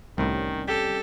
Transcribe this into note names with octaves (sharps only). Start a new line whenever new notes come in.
C2 A2 D#3 G3 C4 C#4
G4 A4